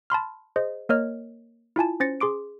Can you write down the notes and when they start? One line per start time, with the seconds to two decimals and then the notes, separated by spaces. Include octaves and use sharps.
0.10 A5 B5 C6 F6
0.56 G#4 C5 D#5
0.89 A#3 A#4 C#5 D#5 F6
1.76 E4 F4 G#5 A5
2.00 C#4 C5 A6 A#6 C#7
2.20 G#4 C6 D6 D7